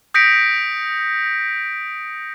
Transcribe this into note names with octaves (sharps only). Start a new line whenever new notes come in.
D#6 G6 A#6 B6 C#7 D7